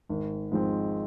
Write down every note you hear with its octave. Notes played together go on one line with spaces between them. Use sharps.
G#1
G#2 F3 G#3 C4